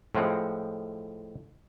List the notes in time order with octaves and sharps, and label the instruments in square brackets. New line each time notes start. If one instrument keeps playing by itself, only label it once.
[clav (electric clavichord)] A2 F3 G#3 C4 F#5